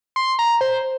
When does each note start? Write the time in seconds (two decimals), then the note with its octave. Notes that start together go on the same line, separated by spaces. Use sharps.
0.16 C6
0.39 A#5
0.61 C5